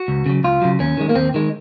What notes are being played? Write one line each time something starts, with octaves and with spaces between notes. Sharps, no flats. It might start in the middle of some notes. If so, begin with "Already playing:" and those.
Already playing: F#4
C#2
C#3 F#3
C#2 F4
C#3 F#3
D#2 C#4
D#3 G#3
A#3
D#2 C4
D#3 G#3